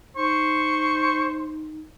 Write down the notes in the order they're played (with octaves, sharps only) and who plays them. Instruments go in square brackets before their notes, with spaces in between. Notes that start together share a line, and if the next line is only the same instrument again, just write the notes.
[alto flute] D#4 [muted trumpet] C5 [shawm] C#6